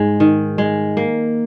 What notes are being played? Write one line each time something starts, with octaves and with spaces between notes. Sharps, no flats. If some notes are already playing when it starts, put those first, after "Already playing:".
Already playing: G#2 G#3
D#3
G#3
A#3